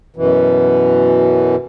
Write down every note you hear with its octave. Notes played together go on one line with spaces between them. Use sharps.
F#2 B2 E3